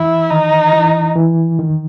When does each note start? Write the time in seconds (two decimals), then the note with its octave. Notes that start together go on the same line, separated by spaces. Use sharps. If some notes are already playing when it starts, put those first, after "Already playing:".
Already playing: E3 E4
0.31 D#3 D#4
0.73 E3
1.16 E3
1.59 D#3